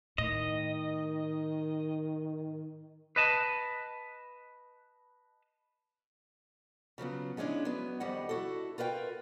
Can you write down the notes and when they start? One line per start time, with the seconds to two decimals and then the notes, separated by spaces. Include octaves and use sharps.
0.18 A2 D#3 D#5
3.16 B4 D#5 A5
6.98 C#3 F3 F#3 B3
7.37 F3 G#3 C#4 D4 E4
7.65 F#3 B3
8.00 F2 D#3 G3 D#5 F#5
8.29 E4 F#4 A4
8.78 F4 A#4 B4 D#5 G5